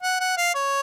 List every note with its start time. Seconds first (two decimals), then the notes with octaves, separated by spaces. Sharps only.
0.03 F#5
0.20 F#5
0.37 F5
0.55 C#5